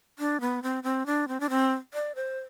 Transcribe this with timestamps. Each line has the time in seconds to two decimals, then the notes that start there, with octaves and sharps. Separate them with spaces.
0.19 D4
0.41 B3
0.63 C4
0.83 C4
1.06 D4
1.28 C4
1.40 D4
1.50 C4
1.94 D5
2.15 C5